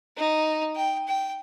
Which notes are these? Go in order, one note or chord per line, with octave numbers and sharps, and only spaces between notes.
D#4
G5
G5